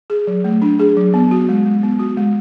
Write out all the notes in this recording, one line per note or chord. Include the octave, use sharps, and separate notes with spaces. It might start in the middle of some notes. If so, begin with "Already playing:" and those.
G#4
F#3
A3
D4
G#4
F#3
B3
F#4
G#3
G#3
B3
F#4
G#3